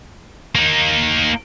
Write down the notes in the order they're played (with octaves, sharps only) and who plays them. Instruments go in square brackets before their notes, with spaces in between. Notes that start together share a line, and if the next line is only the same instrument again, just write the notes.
[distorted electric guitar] A#3 D#4